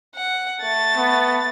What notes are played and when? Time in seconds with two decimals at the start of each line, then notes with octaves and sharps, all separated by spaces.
0.15 F#5
0.62 A3 A6
0.96 B3